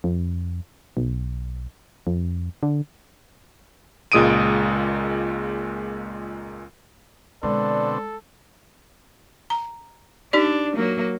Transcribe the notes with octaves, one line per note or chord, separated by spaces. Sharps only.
F2
B1
F2
D3
C#2 A#2 G#3 D#6 D7 D#7
B2 D3 G#3 C4 A4 D5
A#5
D4 D#4 G4 D5
F#3 A#3